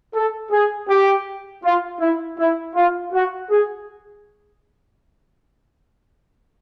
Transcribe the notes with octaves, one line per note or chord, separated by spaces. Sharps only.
A4
G#4
G4
F4
E4
E4
F4
F#4
G#4